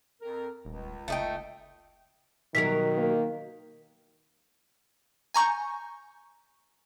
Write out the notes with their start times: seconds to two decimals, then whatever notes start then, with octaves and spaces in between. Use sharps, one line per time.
0.21 F2 A#4
0.65 D#1 C#2
1.08 F#1 A3 D#4 G5
2.55 B2 D#3 F#3 A#4 B6
2.98 A#3
5.34 G#5 A#5 C#6 G6